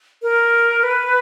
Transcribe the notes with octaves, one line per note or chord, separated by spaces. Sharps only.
A#4
B4